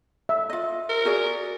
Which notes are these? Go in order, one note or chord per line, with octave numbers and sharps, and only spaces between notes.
E5
F4 D#5
A#4
F#4 G#4 D5